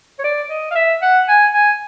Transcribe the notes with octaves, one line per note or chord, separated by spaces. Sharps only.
C#5
D5
D#5
F5
E5
F#5
G#5
G#5